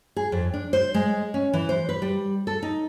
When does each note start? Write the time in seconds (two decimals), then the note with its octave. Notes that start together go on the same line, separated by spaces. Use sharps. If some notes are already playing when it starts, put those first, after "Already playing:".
0.16 G#4
0.32 F2
0.54 D4
0.73 C5
0.94 G#3
1.34 C#4
1.53 E3
1.69 C5
1.89 B4
2.02 G3
2.47 A4
2.63 D#4